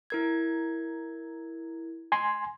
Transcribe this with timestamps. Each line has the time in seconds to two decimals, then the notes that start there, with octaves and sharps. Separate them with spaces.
0.10 E4 A#4 G#6
2.12 G#5 C6